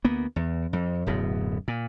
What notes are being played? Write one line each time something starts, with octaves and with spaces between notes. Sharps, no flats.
D2 A#3 B3
E2
F2
D1 F#2 B2
A#2